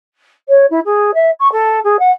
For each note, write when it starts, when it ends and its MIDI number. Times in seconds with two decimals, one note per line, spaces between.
0.49 0.66 73
0.70 0.80 64
0.85 1.11 68
1.14 1.30 76
1.40 1.51 85
1.52 1.80 69
1.84 1.97 68
1.99 2.11 78